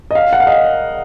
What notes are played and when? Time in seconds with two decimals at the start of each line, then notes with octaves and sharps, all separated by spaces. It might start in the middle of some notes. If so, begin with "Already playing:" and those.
0.11 D#5
0.15 F5
0.33 F#5
0.40 F5
0.47 D#5